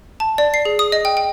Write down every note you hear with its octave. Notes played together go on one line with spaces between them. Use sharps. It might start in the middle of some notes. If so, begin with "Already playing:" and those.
A5
D5
C7
G#4
D#6
D#5
G5
G5